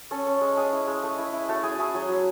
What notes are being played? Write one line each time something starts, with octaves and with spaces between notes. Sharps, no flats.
C#4 A4
C#4
G#3
G#3 G#4
E4
G#3
A3
E4
E4
A3 F#4
E4 G#4
E4 G#4
F#3 G#4
F#3